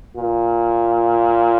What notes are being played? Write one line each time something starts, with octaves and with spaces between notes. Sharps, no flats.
A#2